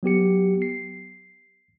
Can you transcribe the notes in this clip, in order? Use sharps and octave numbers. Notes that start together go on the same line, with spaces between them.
F#3 B3 G4 C#7
C7